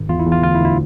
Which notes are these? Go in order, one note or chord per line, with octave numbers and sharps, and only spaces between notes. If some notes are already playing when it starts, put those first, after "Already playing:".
Already playing: G#1
E2 F4
E4
E2
F4
D2 F4
E4
D2
E4